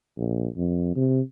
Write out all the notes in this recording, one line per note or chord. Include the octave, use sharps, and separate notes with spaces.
A#1
F2
C3